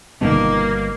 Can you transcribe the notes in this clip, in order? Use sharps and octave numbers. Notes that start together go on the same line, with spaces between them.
G1 B2 D#3 G3 A#3 B3